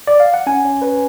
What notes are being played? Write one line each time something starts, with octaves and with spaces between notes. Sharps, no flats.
D5
F5
F#5
C#4 G#5
C#4
C#4 B4